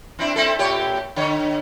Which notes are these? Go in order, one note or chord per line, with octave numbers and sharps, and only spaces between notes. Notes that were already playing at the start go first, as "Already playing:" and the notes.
C4 D4 E4
C4 E4 A4
A#2 G4 C#5
D3 C#5